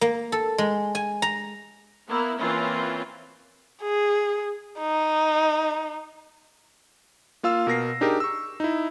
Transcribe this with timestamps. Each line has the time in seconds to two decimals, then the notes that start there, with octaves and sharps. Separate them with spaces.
0.01 A#3
0.32 A4
0.58 G#3
0.95 G#5
1.22 A#5
2.08 A#3 B3 E4
2.38 E3 A#3 C4 C#4 E4 F4
3.82 G#4
4.80 D#4
7.43 A#3 F4 F5 E6
7.67 B2 A#4 A#6 C7
8.01 D4 D#4 G4 G#4 A#4
8.20 C#6 E6
8.60 D#4 E4